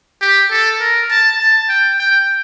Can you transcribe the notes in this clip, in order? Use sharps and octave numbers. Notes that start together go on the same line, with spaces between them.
G4
A4
A#4
A5
A5
G5
G5